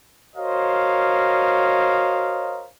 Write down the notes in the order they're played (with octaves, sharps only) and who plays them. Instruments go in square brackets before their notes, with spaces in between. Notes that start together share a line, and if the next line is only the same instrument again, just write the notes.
[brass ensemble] F#4 A#4 C5 C#5 D#5 F5